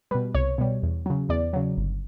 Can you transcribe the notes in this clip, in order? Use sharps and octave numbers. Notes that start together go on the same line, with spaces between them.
B2 G3 B4
C2 C#5
B2 G3
E2
C#3 F#3
E2 D5
C#3 F#3
G1